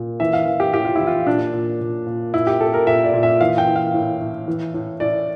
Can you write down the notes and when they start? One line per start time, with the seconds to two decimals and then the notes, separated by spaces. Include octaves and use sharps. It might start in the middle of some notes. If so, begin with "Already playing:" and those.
Already playing: A#2
0.20 E3 E5
0.33 F5
0.46 E3
0.60 G4
0.74 A2 G4
0.85 F4
0.95 E3 E4
1.07 F4
1.27 A#2 D4
1.54 A#2
1.81 A#2
2.07 A#2
2.34 A#2 E4
2.47 G4
2.60 A#2 A4
2.74 A#4
2.87 A#2 E5
3.04 D5
3.14 A#2
3.23 E5
3.41 E3 F5
3.58 G5
3.67 E3
3.76 F5
3.94 A2
4.21 A2
4.48 E3
4.74 A2
5.00 A2 D5